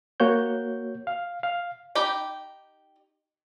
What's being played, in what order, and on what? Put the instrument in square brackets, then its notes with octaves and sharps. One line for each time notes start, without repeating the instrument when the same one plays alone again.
[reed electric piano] A#3 F#4 C#5 G6
F5
F5
[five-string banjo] D#4 G4 B5